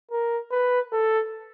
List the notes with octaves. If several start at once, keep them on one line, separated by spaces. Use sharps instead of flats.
A#4
B4
A4